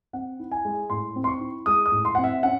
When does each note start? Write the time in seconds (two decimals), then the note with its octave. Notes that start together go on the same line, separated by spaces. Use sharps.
0.13 C4 F#5
0.39 E4
0.51 G#5
0.65 G#3
0.90 A2 C6
1.16 C4
1.24 C6
1.28 C#6
1.40 E4
1.66 G#3 D#6
1.86 D#6
1.92 A2
2.05 C6
2.15 C4 F#5
2.24 E5
2.43 C#4 F#5